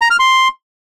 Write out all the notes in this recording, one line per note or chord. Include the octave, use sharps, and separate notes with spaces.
A#5
F6
C6